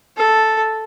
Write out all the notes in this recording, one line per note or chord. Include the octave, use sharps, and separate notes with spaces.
A4